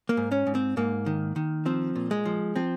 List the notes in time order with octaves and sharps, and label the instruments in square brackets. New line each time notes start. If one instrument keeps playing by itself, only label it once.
[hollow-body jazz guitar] A#3
G#2
C#4
G#2
C4
G#2 A#3
D#3
D#3
F3 C4
A#2
G#3
F3
F3 C4